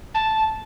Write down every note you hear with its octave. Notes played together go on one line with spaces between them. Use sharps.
A5